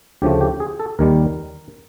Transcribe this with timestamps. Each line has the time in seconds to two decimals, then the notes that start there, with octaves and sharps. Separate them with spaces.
0.22 D2 C#3 F3 A3 G4
0.41 G4
0.60 G#4
0.80 A4
0.99 D#2 D#3 G3 A#4